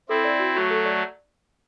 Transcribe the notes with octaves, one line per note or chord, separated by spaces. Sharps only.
C4 E4 A4
D5
F#4
F#3 A3 F#4
A4
D5